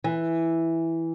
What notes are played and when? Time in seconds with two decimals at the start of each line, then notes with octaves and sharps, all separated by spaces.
0.04 E3